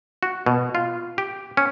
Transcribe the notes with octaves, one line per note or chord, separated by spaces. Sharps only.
F#4
B2
F4
G4
C#4